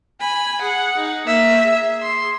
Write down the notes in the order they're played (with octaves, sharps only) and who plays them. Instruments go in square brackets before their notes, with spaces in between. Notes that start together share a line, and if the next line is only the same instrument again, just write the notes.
[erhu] G#5 [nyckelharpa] B5
[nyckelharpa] G#4 [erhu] F#5
[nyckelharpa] D#4
[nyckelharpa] A#3 A#4 [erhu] E5
[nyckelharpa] G#4
[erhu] C6